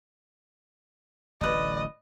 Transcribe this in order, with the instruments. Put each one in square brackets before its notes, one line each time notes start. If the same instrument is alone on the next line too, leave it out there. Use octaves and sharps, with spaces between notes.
[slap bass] D1 A1 D2 [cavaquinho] B4 D5 [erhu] D#5